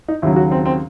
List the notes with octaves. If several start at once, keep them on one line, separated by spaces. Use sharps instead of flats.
D#4
D#2 C#3 F#3 E4
F#4
C4
C4